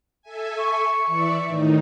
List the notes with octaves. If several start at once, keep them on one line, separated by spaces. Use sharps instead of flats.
A4 E5 G#5
C#6
E3 D5 E5
A2 D#3 D#4